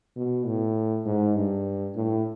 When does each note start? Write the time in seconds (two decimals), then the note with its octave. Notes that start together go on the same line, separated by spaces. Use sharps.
0.16 B2
0.46 A2
1.05 G#2
1.35 G2
1.95 A2